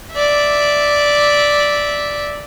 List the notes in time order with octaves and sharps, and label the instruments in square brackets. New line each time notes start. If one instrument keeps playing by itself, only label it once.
[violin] D5 E5